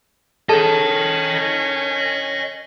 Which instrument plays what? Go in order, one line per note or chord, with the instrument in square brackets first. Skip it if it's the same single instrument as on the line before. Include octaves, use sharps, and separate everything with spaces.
[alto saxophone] C#4 [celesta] G#4 A4 D#7 [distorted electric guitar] D#5 G5 [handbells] A5